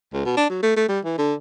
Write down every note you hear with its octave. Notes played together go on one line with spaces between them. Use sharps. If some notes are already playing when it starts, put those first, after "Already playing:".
C#2
B2
D4
F#3
A3
A3
G3
E3
D3